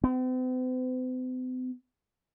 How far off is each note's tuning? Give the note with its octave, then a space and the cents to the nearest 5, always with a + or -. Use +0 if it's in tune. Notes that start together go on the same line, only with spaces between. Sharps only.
C4 -45